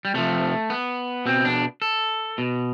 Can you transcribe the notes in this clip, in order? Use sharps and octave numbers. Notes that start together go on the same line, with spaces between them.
G3
C3 F3 A3
B3
B2 C4
D4
A4
B2